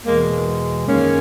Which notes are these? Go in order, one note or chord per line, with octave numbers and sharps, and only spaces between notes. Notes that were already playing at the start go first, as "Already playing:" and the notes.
E2 B2 G#3 A#3
F#2 D#3 G#3 A#3 C#4